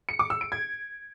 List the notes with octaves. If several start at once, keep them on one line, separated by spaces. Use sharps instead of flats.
C#7
D6
E6
D7
G#6